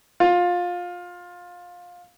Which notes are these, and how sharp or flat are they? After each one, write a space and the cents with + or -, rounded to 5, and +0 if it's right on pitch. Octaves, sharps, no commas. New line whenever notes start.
F4 +20